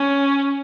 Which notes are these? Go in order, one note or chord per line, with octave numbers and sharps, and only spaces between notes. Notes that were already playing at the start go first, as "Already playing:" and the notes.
Already playing: C#4